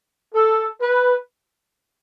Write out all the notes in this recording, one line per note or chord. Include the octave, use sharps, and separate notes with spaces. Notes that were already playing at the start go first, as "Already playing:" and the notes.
A4
B4